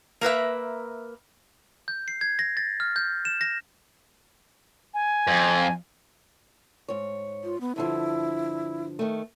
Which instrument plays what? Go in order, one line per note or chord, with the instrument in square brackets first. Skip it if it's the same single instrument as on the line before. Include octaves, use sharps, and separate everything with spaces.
[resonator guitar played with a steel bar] A#3 A#4 B4 E5
[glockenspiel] G6
C7
G#6
A#6
A6
F6
G6
E7
A#6
[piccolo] G#5
[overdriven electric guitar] F2
[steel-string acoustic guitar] G#2 C#5
[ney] F4
B3
[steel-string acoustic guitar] G2 D3 F3 [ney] E4
[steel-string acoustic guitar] D#3 A3